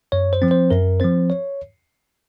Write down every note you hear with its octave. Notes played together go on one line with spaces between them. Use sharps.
F#2 C#5
C5
F3 C4
C5
F#2 A#4
F3 C4 C5
C#5